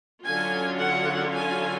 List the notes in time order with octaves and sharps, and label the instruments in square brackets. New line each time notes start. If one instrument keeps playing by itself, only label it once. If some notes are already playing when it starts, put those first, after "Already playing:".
[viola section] D3 F#3 C#4 F4 G#5
F#5
G#5